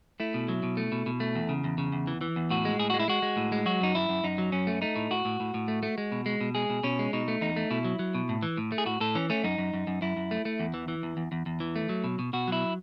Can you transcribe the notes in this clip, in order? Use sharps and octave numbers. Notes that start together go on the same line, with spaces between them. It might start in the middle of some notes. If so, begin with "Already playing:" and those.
A3 E4
B2
F#3
B2
A3
B2
B2
A3
E2
C#3
E2
C#3
E2
E3
E3
E2
A2 F#4
G#3
A2 G#4
G#3 F#4
E4
G#3 F#4
G#3
A2
G#3
F#3 F#4
F#2 D#4
F#2 E4
F#2
F#2 D#4
F#3
F#2 C#4
A3
A3 D#4
A2
A2 F#4
A2
A2
A2
A3
A3
G#3
B2
G#3
B2
G#3 G#4
B2
B2 C#4
G#3
B2 D#4
A3
E2 D#4
A3
B2 E4
F#3
F#3
B2
A2
E3
A2
A3
G#4
A2 F#4
A2 A4
E3 C#4
A3 C#4
F#2 D#4
F#2
F#2
F#2
F#2 E4
F#2
A3
A3
E2
E3
E3
E2
E2
E2
E2
E3
A3
F#3
B2
B2
B2 F#4
F#3 E4